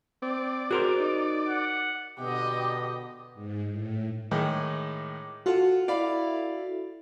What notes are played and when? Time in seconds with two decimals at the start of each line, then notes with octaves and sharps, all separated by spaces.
0.22 C4 D5
0.71 F#4 G#4 A#4 C5
1.00 D#4
1.48 F#5
2.19 B2 D3 B3 G4 D#5
3.34 G#2
3.69 A2
4.31 A2 D#3 G#3 D6
5.46 F4 F#4 A4 F#5
5.88 E4 D5 F5 B5